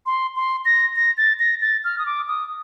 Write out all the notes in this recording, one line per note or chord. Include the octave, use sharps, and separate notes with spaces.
C6
C6
A#6
A#6
A6
A#6
A6
F6
D#6
D6
D#6